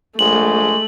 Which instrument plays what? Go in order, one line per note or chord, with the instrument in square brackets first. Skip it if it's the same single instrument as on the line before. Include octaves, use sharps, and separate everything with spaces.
[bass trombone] A#1 [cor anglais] G#3 [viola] A3 [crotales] F#7